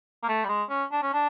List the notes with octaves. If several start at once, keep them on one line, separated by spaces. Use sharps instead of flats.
A#3
A3
G3
G#3
C#4
D4
C#4
D4